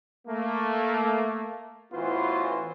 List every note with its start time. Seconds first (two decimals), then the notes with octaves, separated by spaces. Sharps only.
0.27 A3 A#3
1.92 A1 E3 B3 F4 F#4 C5